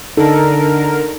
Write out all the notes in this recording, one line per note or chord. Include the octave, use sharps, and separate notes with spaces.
D3 D#4 A4 A#4